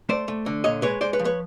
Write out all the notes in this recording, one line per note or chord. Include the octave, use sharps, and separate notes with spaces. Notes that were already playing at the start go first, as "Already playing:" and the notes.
A3 C5 D5
A3
D3
A#2 C#5 D#5
G#3 B4 C#5
G#3 C5 D5
B4 C#5
F3
B4 C#5